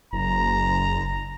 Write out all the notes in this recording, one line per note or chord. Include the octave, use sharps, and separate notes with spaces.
F#1 A#5